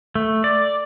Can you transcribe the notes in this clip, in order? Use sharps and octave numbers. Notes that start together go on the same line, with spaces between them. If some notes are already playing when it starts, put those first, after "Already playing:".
A3
D5